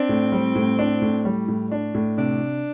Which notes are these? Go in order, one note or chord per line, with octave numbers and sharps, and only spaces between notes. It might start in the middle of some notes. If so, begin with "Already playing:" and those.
Already playing: C4 D4
A2
G3
A2
D4
A2
G3
A2
D4
A2
C3 D4